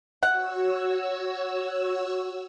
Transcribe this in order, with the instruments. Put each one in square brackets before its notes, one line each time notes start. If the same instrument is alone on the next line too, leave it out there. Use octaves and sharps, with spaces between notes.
[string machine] F#4 C#5 E6 [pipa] F#5